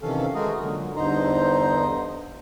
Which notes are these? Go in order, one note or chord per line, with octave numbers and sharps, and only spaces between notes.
C3 D#3 E3 C#4 A4 F5
G#3 A3 F#4 G#4 A#4
A#2 D3 F#3
E2 G2 D3 D#4 C5 A#5